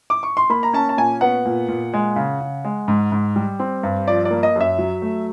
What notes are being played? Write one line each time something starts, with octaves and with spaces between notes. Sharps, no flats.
D6
C#6
C6
A#3 B5
A#5
C#4 A5
A5
A#2 G#5
B3 F#5
A#2
A#2
G#3
C#3
C#3
G#3
G#2
G#2
G3
C4
G2
F3 D5
D5
A#3
D#5
F#2 E5
F#3
A3